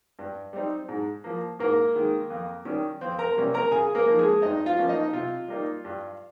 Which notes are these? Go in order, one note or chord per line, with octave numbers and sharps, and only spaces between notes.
G2
G3 C4 D#4
G#2
F3 A#3
G#2 A#3 A#4
D#3 G#3
F2
D#3 G3 C#4
F2 C4 C5
A#4 A#5
C3 G3 A#3 C#4
A#4 A#5
C#3 G#4 G#5
A#3 A#4
F3 A#3 D#4
G#3 G#4
G2 D#4 D#5
F4 F5
F3 A#3 C#4
D#4 D#5
C3 F4
G3 A#3 D#4
G2